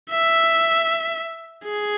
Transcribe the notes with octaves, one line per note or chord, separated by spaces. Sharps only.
E5
G#4